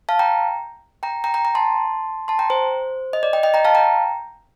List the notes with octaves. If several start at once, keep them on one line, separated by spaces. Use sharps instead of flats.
F5 A5
G5 A#5
G5 A#5
G5 A#5
G5 A#5
G5 A#5
A5 C6
A5 C6
G5 A#5
C5
D#5
D5
D#5 G5
D#5 G5
G5 A#5
F5 A5
G5 A#5